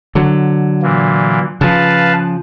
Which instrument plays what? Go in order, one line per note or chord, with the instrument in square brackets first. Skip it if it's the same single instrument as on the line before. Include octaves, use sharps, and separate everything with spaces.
[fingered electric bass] D3 F#3
[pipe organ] A#2 E3 A#3
[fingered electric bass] C#3 F3 [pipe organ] B4 F5 A5